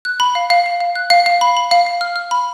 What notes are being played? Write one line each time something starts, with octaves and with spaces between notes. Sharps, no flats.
F#6
B5
F5
F5
F5
F5
F#6
F5
F5
B5
B5
F5
F5
F6
F6
B5